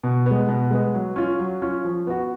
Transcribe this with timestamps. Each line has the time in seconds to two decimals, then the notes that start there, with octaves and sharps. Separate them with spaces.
0.03 B2
0.26 G#3 B3
0.49 B2
0.71 G#3 B3
0.94 F#3
1.16 C#4 F4
1.39 F#3
1.62 C#4 F4
1.85 F3
2.07 B3 F#4